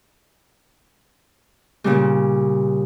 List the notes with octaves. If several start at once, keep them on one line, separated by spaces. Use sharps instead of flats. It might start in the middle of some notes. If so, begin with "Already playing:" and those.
A#2 C#3 G3